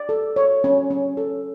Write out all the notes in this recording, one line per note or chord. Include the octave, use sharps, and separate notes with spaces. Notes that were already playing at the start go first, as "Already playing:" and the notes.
Already playing: D5
A4
C#5
C#4
C#4
A4